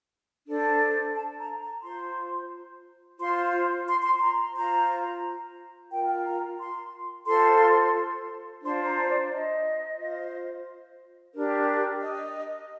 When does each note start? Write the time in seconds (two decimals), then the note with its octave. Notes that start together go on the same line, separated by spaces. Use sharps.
0.46 D4 A4 C5
1.15 A5
1.38 A#5
1.60 A#5
1.82 F4 C5 C6
3.18 F4 C5 C6
3.86 C6
4.02 C6
4.21 A#5
4.54 F4 C5 A#5
5.90 F4 A#4 G5
6.25 A#5
6.58 C6
7.26 F4 A4 C5 C6
8.62 D4 F4 C5 C6
8.85 A#5
9.07 D5
9.31 D#5
9.98 F4 C5
11.34 D4 G4 A#4
12.02 D#5